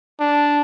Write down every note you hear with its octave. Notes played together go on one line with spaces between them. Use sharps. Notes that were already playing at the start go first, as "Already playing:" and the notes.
D4